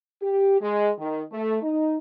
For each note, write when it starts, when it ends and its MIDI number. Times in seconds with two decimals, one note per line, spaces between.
0.22 0.58 67
0.61 0.90 56
0.98 1.22 51
1.32 1.58 57
1.63 1.98 63